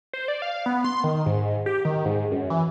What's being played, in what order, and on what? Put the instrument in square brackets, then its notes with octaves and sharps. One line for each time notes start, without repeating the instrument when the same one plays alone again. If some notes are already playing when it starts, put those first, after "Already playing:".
[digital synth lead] C5
D5
F5
B3
C6
D#3
G#2
G4
D#3
G#2
F#2
E3